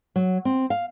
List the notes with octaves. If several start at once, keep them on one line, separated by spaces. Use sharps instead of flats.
F#3
C4
F5